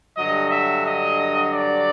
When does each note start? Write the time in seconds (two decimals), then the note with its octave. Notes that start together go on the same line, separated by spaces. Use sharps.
0.17 G2 D3 F#3 D#5
0.51 E5
0.85 D#5
1.53 D5